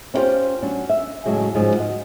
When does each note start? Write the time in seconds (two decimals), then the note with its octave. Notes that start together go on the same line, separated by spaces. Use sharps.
0.14 C#4 E4 F4 G4 C5
0.62 F#3 C#4 D4
0.89 E5
1.26 A2 C#3 F#3 G#3
1.55 G#2 C#3 F3 F#3 G#3
1.77 F#4 D#5